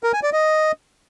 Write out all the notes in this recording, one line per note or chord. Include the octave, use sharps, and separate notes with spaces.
A#4
G#5
D5
D#5